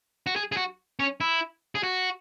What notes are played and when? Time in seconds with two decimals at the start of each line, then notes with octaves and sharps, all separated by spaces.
0.27 F#4
0.36 G#4
0.52 G#4
0.57 F#4
1.00 C#4
1.20 E4
1.75 G#4
1.83 F#4